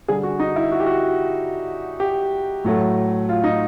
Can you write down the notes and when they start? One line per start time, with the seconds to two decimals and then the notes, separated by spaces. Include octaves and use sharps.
0.08 D3 G3 G#4
0.23 F#4
0.39 D#4
0.56 E4
0.72 F#4
0.80 G4
0.86 F#4
2.00 G4
2.64 A2 F#3 A3
3.29 F4
3.44 D#4